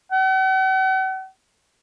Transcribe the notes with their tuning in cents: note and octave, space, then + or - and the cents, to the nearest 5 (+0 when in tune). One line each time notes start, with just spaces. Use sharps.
F#5 +45